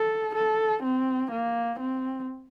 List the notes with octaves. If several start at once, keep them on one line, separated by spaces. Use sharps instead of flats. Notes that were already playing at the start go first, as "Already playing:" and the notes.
Already playing: A4
A4
C4
A#3
C4